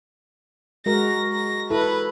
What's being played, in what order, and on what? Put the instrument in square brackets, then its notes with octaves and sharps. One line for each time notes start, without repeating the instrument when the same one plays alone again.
[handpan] G#3 F#4 A#4 [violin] A#6
[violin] A#6
[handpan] E4 A4 [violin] B4